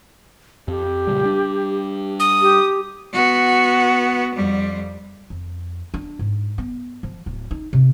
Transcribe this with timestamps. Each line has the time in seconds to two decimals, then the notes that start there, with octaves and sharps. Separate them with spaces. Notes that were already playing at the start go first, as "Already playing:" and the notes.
0.68 F2 G4
1.07 A#2 C#3 G3
1.23 G3 D4
2.20 D#6
2.41 G4
3.13 B3 F#4
4.35 F2 G3
5.30 F2
5.94 D4
6.19 G#2
6.58 B3
7.03 F3
7.26 D1
7.51 D#4
7.73 C3